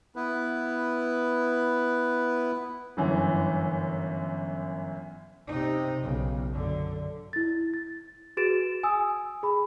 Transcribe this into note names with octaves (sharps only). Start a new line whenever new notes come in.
B3 E4 B4
G1 F#2 E3
C3 D#4
B1 C#3
F#2 D3
E4 A6
A6
F#4 G#4 B4 A6 D7 E7
G#5 D#6 E6
G#4 B5